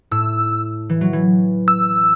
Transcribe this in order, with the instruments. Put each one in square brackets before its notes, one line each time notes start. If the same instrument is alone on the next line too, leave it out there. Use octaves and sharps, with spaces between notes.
[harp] A2 [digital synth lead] E6
[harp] E3
F#3
E3
[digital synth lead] E6